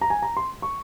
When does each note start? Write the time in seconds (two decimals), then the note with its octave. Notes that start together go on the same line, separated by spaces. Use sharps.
0.01 A#5
0.10 G#5
0.22 A#5
0.37 C6
0.62 C#6